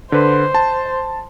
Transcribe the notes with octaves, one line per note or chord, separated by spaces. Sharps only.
D3 B4 C5
A5